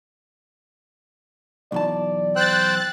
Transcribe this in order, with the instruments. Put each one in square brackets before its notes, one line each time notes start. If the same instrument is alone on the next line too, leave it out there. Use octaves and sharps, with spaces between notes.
[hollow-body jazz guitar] B1 E2 A5 [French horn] D5
[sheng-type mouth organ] C5 G5 E6 [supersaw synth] F#6 A6